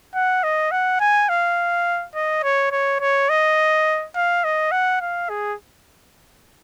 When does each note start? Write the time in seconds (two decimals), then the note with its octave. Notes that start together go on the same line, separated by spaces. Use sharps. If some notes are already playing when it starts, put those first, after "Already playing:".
0.15 F#5
0.44 D#5
0.72 F#5
1.00 G#5
1.29 F5
2.15 D#5
2.43 C#5
2.72 C#5
3.00 C#5
3.30 D#5
4.16 F5
4.44 D#5
4.72 F#5
5.01 F5
5.29 G#4